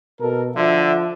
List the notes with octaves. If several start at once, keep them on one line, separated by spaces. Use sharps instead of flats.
B2 A4 A#4
D3 F3 E5